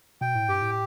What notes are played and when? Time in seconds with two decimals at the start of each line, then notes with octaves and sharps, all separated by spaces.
0.21 B2 G5
0.35 A2
0.49 G2 G4
0.62 A2